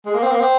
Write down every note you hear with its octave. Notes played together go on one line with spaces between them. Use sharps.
G#3
A#3
C4
A#3
C4